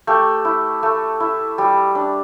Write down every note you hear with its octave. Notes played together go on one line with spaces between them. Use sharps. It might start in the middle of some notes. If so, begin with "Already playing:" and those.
A3 G4
E4
A3
E4
G3
D4